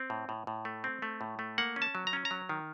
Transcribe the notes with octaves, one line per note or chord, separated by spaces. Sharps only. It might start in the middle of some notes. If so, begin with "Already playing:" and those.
Already playing: C4
A2
A2
A2
A3
C4
A3
A2
A3
A#3 F#5
C#4
A5
F#3
A#5
C#4
A#5
F#3
D#3